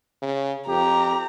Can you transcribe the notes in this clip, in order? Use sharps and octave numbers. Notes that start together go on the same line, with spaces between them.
C#3
F2 G4 A#5